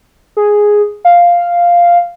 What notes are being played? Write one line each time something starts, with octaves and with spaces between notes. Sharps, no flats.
G#4
F5